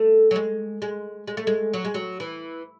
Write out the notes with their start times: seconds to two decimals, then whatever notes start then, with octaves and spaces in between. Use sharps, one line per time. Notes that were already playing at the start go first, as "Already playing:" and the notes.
Already playing: A3
0.31 F#3
0.36 G#3
0.82 G#3
1.27 G#3
1.37 A3
1.47 G#3
1.73 F#3
1.85 G#3
1.94 F#3
2.20 E3